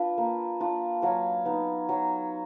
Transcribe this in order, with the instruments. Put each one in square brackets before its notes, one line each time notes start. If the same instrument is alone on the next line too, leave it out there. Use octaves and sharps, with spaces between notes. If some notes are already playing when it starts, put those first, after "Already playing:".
Already playing: [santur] D4 F4 B4
A#3
D4 F4
F#3 F5
B3 D#4
F#3